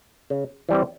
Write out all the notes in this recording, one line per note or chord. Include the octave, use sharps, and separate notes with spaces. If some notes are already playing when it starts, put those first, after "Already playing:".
C#3
E3 G3 C4